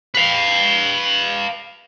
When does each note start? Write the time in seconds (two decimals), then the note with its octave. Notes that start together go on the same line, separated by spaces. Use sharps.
0.15 B4 F5